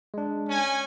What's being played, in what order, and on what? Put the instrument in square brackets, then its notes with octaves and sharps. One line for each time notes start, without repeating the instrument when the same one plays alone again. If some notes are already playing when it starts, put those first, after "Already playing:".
[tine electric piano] G#3 D4
[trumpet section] C#4 G#5